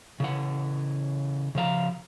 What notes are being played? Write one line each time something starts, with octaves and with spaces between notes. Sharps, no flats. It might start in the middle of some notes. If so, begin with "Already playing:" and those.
C#3 E3 F#5
C#3 F3 F5 A#5